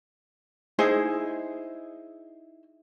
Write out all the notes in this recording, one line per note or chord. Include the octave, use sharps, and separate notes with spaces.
D#4 E4 G#4 C5